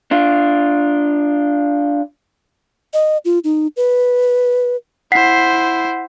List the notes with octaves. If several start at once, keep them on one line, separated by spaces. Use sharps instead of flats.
D4 F4
D#5
F4
D#4
B4
E4 C5 F#5 B6 C7